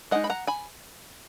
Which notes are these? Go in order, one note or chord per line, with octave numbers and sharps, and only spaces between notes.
G#3 D#4 D#5 F#5
B5
F#5 A#5
G#5 B5